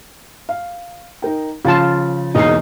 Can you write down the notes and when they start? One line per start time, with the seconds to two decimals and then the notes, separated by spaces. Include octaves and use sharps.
0.49 F5
1.22 D#4 A#4 G5
1.65 C#3 F3 F4 A5 A6
2.35 E1 E2 C#3 A#3 D#4 C7